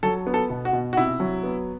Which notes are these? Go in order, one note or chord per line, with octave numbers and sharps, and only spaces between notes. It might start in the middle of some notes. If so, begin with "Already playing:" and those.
F#3 A4
B3
A4
B2
F#4
B2
F#4
C3 E4
F#3
B3